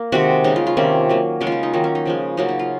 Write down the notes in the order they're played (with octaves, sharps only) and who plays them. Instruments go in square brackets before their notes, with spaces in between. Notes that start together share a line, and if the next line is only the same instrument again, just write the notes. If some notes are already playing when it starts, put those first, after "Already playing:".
Already playing: [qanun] A#3
C3 D#3 G#3 F#4
C#3 G#3 D#4
F4
F4
C3 D#3 A#3 C#4
D#3 F#3 A#3
C#3 G#3 C#4
F4
D#4
D#4
D#3 F#3 A#3 D#4
C#4
D#4
C#3 F3 G#3
C#3 F#3 A#3 D#4
D#4
F4